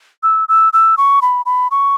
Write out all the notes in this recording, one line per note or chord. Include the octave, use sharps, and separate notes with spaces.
E6
E6
E6
C#6
B5
B5
C#6